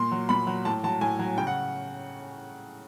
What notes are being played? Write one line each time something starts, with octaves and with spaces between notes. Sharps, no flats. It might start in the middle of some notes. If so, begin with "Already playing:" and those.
Already playing: A#2 C6
F#3
A#2 B5
F#3
A2 A5
F#3 A5
A2 G#5
F#3
C#3 G5
F#5